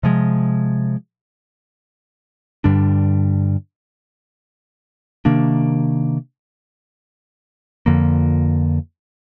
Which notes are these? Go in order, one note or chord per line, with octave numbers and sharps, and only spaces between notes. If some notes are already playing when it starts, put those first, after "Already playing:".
C3 F3 G#3
G2 D3 G3 D4
C3 D#3 A#3 D4
F2 D3 F3 A#3